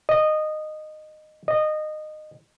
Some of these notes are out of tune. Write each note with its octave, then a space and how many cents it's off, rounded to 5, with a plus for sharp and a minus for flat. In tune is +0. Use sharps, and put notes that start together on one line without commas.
D#5 -15
D#5 -20